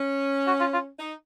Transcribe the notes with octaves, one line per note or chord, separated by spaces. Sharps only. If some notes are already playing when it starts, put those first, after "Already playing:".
Already playing: C#4
F#4
F4
F4
D#4